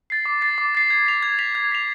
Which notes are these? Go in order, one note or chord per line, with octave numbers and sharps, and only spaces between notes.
A6 C7
D6
A6 C7
D6
A6 C7
G#6
B6 F7
G#6
B6 F7
G#6
B6 F7